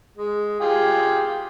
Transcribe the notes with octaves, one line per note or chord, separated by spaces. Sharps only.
G#3
F4 G4 G#4